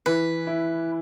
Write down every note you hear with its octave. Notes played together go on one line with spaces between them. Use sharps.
E3 B4
E4